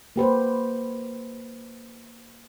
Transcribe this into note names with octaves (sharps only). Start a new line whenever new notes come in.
A#3 G4 B4 C5